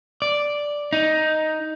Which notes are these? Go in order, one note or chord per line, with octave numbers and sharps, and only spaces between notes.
D5
D#4